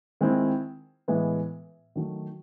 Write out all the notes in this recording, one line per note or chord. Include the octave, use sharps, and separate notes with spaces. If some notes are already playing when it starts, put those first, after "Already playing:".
D#3 G#3 C4 E4
A2 E3 G#3 B3
D#3 F#3 A3